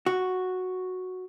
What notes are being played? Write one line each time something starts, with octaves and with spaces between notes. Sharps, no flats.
F#4